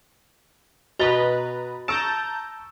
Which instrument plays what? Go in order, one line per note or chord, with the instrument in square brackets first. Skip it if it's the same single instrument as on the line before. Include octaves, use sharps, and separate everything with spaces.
[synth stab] B2 B4 A#5 [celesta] F#4 G7 [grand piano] D#5 A6
[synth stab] A5 A#5 G6 [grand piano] C#6 E6 D7 [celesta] E7